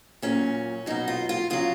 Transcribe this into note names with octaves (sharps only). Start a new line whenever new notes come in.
A#2 F#3 C#4
B2 F#3 D#4
F4
F4
C#3 F#3 F4